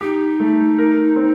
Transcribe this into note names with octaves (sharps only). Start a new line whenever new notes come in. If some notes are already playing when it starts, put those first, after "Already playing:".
D#4 G4
A3
A#4
C4